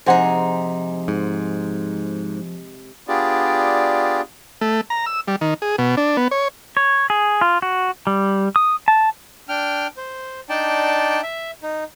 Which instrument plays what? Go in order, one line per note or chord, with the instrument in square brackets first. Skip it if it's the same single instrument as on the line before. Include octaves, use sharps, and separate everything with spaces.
[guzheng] C3 G#3 D#4 [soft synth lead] F3 [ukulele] G#4 C5 F#5
[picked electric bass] G#2
[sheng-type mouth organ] B3 D4 F4 G4 G#4 D5
[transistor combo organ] A3
A#5
E6
G3
D#3
G#4
B2
D4
B3
C#5
[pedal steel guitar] C#5
G#4
F4
F#4
G3
D#6
A5
[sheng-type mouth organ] D4 G5 F6
C5
D4 D#4 D5 G5 A5
E5
D#4